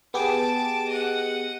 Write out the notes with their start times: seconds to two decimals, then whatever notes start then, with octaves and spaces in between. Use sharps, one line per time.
0.14 B3 G4 G#4 A5 D6
0.89 D#5 F#5